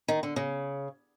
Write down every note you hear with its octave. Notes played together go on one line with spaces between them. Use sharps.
D#3
D3
C#3